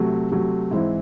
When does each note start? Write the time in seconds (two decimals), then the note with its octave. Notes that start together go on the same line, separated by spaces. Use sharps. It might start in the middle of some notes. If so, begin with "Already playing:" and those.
Already playing: C3 F#3 A3
0.31 C3 F#3 A3
0.71 G#2 E3 C4 E4